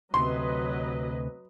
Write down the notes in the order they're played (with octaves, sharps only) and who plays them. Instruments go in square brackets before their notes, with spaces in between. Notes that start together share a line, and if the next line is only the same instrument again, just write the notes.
[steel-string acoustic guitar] D2 C3 [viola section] F#3 B4 D#5 [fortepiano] C6